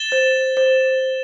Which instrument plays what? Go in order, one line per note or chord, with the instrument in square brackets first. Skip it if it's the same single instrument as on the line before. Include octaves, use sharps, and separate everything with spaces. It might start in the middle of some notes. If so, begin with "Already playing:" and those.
Already playing: [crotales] A6 E7 G7
[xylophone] C5
C5